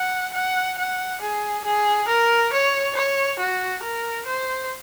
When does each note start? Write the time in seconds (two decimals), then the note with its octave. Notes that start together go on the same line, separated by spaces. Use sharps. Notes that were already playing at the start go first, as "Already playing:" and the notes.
Already playing: F#5
0.34 F#5
0.79 F#5
1.22 G#4
1.65 G#4
2.08 A#4
2.53 C#5
2.95 C#5
3.39 F#4
3.84 A#4
4.27 C5